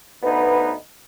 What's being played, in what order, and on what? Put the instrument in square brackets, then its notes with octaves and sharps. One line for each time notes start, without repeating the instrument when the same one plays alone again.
[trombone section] D2 B3 D#4 B4